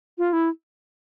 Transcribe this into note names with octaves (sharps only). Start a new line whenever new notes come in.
F4
E4